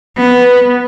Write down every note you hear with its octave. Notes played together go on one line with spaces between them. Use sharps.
B3